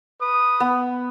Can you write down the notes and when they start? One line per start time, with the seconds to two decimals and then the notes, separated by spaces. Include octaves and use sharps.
0.19 B4 D#6
0.60 B3